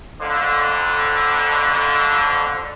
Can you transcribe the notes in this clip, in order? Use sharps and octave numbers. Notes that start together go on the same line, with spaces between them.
F2 D3